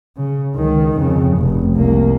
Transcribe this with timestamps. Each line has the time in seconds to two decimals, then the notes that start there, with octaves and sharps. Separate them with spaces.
0.17 C#3
0.55 C#2 D#3
0.97 F2 C#3
1.37 F1
1.75 C2 A#3